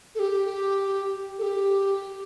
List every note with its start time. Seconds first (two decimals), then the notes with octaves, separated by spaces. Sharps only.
0.15 A4
0.19 G4
1.39 A4
1.43 G4